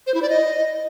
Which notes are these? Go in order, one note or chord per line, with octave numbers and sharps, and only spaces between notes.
C5
E4
D5
D#5